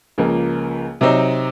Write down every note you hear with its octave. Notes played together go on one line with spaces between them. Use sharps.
C#2 C#3 F3 A#3
C3 F#3 C4 D#4